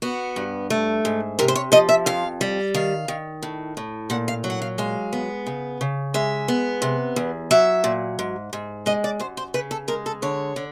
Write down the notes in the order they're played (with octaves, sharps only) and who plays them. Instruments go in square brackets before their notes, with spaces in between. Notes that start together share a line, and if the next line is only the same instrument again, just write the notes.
[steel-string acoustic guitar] B3 F#4
G2
A3
G#2
C3 A#4
C5
C#5
F3 D#5
E5
F2 F5
G3
D#3 F5
D#3
A2
A2
A#2 F#5
F5
F#3
F#5
F5
G#3 F5
B3
C#3
C#3
G#3 E5
B3
C3
E2
F#3 E5
A#2
G#2
G#2
G#3 D#5
D5
F#2 C5
C5
C#3 B4
A4
G#3 A#4
A4
D3 C#5
D3